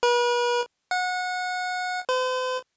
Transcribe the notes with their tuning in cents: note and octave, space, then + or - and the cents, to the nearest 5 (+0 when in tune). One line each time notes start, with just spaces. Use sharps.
B4 -40
F#5 -25
C5 -45